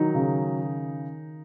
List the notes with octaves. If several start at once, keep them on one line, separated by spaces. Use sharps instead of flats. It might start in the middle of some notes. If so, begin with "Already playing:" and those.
Already playing: D#3 F#3 D#4
C#3